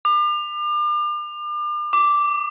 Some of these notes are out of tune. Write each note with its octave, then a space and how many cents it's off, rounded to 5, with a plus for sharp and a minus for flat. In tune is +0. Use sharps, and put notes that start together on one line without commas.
D6 +40
D6 -5